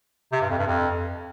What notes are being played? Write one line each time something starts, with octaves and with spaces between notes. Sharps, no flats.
C3
G2
F2
G2
F2